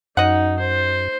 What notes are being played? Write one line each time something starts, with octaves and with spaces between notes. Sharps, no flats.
F#2 D#4 D#5 F#5
C5